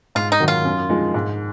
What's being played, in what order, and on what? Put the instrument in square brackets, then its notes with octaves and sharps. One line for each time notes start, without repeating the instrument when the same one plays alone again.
[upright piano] G#2 [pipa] F4
[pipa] D#4
[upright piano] D#3 F#3
[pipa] F4
[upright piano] F#2
F3 G#3 D#4
G#2